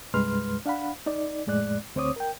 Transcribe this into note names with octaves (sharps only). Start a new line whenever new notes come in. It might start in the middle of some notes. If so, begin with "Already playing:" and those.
C2 G2 G#3 B4 C6 F6
D4 F5 F#5 B5
D#4 D5
F2 A2 G#3 D5 F#6
D2 C4 C5 C#5 D6 D#6
A#4 G5